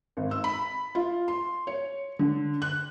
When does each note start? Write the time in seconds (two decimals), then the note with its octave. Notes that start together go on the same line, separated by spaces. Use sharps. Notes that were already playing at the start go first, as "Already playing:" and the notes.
0.17 G#1
0.31 E6
0.44 B5
0.95 F4
1.28 C6
1.67 C#5
2.19 D3
2.62 F#6